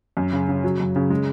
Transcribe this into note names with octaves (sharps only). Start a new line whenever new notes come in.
F#2
C#3
C#3
F#3
F#2
C#3
G#3